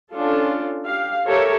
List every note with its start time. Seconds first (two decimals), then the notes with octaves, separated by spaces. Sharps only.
0.13 C#4 D4 F4 A4
0.84 G4 F5
1.25 G4 A4 A#4 C#5 E5